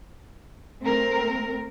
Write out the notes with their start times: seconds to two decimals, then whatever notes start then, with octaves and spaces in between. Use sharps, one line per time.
0.82 A3 C4 A#4